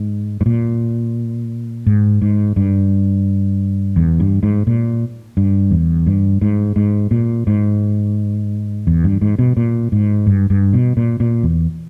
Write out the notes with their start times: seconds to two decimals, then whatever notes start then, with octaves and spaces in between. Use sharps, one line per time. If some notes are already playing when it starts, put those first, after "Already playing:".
Already playing: G#2
0.41 G#2
0.46 A#2
1.86 G#2
2.22 G#2
2.56 G2
3.96 E2
4.20 G2
4.43 G#2
4.67 A#2
5.37 G2
5.71 E2
6.07 G2
6.42 G#2
6.76 G#2
7.11 A#2
7.47 G#2
8.87 E2
9.04 G2
9.22 G#2
9.39 B2
9.57 A#2
9.92 G#2
10.27 G2
10.50 G2
10.73 B2
10.97 A#2
11.20 A#2
11.43 E2